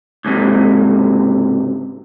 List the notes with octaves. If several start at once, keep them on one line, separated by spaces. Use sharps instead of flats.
C#2 G#2 C3